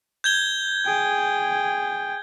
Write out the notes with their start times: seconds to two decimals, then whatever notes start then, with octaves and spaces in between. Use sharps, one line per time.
0.24 G6 G#6 G7
0.85 G#4 G5